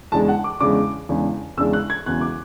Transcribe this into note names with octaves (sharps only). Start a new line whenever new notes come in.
E2 C#3 G#3 D4 A5
F#5
D6
E2 C#3 G#3 D4 D6
E2 C#3 G#3 D4
E2 C#3 G#3 D4 E6
F#6
G#6
E1 E2 C#3 F#6
D6